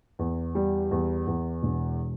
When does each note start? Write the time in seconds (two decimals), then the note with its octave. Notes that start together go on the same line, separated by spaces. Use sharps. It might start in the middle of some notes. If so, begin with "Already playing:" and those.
0.19 E2
0.55 G3
0.91 E2
1.27 E2
1.63 E1